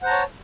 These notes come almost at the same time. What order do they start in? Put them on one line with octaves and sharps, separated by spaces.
F#5 C5 A#5 A5 C#5